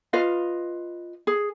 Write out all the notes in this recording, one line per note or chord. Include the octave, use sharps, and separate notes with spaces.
F4 B4 D#5 F5
G#4